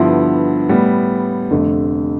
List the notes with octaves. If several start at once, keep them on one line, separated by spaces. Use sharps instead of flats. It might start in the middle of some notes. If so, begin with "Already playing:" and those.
Already playing: G2 D3 F3 B3 E4
A2 G3 B3
F1 F2 D3 A3